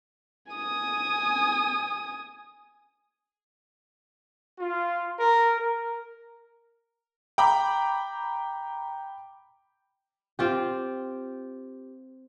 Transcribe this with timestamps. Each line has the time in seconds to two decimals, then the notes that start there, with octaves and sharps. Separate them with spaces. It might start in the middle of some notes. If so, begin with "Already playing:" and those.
0.52 G#5 D#6
4.60 F4
5.20 A#4
5.59 A#4
7.38 G5 A#5 B5 D6
10.39 C4 F4 G4